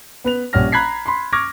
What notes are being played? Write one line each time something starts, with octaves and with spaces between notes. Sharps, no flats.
B3 B4 F7
A#1 G3 C#4 F#5 F6 A#6
A#5 B5 F#6 G#6 B6 C7
B5 C6
C#6 D6 F6 G#6 A#6